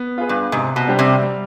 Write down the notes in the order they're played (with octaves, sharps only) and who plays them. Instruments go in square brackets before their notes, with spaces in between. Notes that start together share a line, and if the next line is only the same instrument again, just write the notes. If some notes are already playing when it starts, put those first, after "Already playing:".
Already playing: [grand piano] B3
F4 G#4 B4
[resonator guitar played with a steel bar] G2
[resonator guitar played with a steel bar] G#2 [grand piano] C3
[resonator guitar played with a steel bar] B2
[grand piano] G3 D4 G4 C5
[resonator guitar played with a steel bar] C3
[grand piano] G3